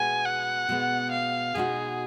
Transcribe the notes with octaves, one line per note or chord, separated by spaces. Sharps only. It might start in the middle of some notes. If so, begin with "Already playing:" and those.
Already playing: B2 G#3 B3 G#5
F#5
B2 G#3 B3
F5
B2 G#3 D#4 F#4 G#4